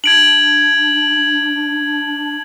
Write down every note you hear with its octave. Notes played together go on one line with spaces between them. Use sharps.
D4 G#6 D7 F#7